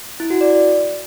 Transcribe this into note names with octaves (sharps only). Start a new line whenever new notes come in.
E4
F#4
D5